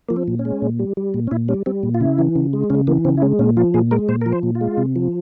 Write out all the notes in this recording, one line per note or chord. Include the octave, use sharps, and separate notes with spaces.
F3 A#3
C4
A#2
C#4
G#3
A#2
G3
G3
A#2
C#4
A#2 E4
G3 C#4
G3 C4
A#2
F4
C#3 E4
E3
C#3
G#3
C#3 C#4
E3 A#3
C#3 C4
E4
G#3 C#4
A#2 C#4
F3 F4
A#2 G#4
G#3 A#4
A#2 C5
F3 A#4
C5
A#2
F4
G#3
C3
F3